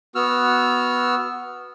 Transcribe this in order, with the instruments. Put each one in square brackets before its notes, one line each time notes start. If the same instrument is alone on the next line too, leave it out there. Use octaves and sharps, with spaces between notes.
[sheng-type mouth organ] B3 F#4 E6 F6